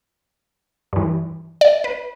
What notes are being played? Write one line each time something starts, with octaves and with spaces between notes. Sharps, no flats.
G2 E3
D5
B4